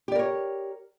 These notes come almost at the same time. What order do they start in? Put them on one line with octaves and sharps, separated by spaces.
G4 D5 A#4 C#5